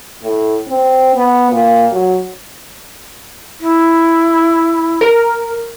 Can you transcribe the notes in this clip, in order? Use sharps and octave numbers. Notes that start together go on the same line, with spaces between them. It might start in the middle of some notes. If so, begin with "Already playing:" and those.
A2
C4
B3
A#2
F#3
E4
A#4